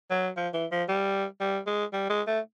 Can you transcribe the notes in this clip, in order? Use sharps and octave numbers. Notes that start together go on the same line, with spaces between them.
F#3
F3
E3
F3
G3
G3
G#3
G3
G#3
A3